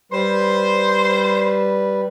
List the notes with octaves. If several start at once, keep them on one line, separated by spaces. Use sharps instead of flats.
G3 B4 C5